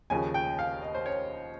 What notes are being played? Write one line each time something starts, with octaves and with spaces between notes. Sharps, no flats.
D#2 C#3 F3 G#5
G5
F5
D#5
C5
C#5